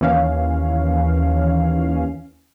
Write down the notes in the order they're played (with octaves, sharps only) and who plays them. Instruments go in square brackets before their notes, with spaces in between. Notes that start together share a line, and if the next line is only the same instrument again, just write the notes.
[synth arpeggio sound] D#2 E3 C#4 F5